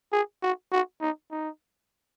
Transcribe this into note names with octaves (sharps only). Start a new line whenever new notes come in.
G#4
F#4
F#4
D#4
D#4